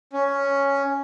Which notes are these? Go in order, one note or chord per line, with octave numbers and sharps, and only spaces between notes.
C#4